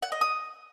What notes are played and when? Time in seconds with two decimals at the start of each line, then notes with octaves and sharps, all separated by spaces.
0.02 F#5
0.12 D#5
0.21 D#6